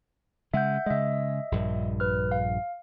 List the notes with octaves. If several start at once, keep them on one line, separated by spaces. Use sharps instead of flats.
C#3 G#3 E5 F#5 G6
C#3 G#3 D#5 E5
A#1 G2
B4 F6
F5